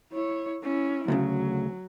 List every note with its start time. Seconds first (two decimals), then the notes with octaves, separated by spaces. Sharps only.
0.12 E4 C#5
0.63 C#4 E4
1.08 D2 A2 C#3 F#3